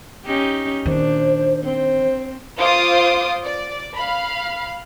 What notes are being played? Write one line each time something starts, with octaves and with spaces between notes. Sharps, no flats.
C#4 D#4 G4
A#2 D#3 D4 C5
C4 C5
F4 C5 F5 D6 D#6
D5
F5 B5